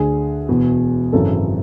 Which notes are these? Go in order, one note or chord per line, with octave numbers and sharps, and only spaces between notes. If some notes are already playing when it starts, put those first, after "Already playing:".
Already playing: D2 D3 G#4
E1 E2 B2
G#1 F#2 C#3 E3 A4